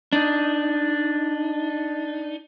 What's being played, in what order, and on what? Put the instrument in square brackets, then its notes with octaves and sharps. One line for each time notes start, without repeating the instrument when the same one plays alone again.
[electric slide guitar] D4 D#4